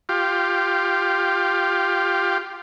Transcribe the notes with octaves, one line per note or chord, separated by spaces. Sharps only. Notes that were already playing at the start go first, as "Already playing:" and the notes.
F4 G4